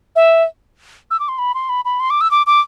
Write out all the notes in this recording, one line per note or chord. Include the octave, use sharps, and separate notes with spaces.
E5
E6
D6
C6
B5
C6
B5
B5
C6
D6
E6
D6
D6